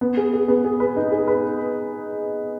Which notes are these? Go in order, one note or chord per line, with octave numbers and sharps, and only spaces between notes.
B3
G#4
G#4
B3
G#4
B4
D#4
G#4
B4